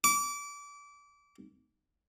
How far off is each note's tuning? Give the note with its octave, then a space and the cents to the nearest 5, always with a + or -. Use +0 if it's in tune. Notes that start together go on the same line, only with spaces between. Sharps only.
D6 -25